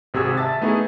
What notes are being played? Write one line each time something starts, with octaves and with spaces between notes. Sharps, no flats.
G#1 C3 F#4 G#4 E6 G#6
E5 A5 A6
A3 B3 D#4 E4 G#4 A4